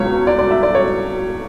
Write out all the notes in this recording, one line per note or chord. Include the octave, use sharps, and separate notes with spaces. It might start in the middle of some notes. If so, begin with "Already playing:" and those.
Already playing: C#2 B2 F#3 C#5
D5
D5
E5
D5
C#5